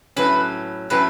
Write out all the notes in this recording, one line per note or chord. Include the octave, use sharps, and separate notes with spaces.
A2 F#3 C#4 B4
A2 F#3 C#4 B4